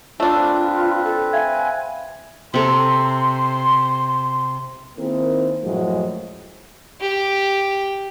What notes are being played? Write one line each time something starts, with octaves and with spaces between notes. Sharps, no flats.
A3 D4 F4
C4 B4
A4
E5 F5 G#5 G#6
C3 A4 A#5 C6
D#3 A#3 C4 E4 G#4 A#4
F#2 A2 F3 F#3 G#3
G4